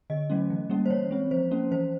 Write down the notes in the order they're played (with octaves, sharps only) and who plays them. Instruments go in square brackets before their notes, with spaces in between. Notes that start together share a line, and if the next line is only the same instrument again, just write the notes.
[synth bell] D3 D#5
F#3 A3 C#4
E3
G3 A#3 C#4
C5
E3 C#5
G#3 C4
F3 C5
A#3 C#4
E3 C5